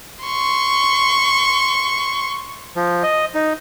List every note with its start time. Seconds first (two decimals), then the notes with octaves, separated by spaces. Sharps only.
0.25 C6 C#6
2.76 F3
3.03 D#5
3.35 D#4